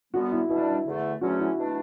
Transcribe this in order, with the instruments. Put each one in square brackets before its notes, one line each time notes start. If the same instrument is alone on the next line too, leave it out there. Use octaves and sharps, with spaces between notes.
[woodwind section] F#2 D3 G3 B3 [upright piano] F#4
[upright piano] E4
[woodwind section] B2 G3 D4 [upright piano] E4
[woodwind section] E2 D3 A3
[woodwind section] E2 D3 F#3 A3 C#4 [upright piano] F#4
[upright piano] E4
[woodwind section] B2 A3 D4